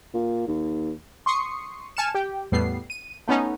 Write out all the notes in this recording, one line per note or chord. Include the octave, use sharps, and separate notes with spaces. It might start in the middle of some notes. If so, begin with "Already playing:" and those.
A#2
D#2
C6 C#6 D#6 C7 C#7
G#5 A5 F6 C#7 E7
G4 G5
E2 A2 G3 B3 C7
D#7
A3 B3 C#4 D#4